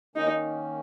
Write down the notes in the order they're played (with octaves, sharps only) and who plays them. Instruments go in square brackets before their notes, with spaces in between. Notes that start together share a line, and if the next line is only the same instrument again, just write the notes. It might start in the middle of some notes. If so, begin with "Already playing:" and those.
[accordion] D#3 A#3 C#4 [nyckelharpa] D#4